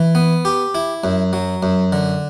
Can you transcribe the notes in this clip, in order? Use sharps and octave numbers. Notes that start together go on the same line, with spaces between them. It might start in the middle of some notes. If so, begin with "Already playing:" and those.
Already playing: E3
B3
G4
E4
F#2
F#3
F#2
D3